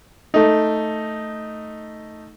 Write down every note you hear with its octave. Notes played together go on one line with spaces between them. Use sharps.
A3 D#4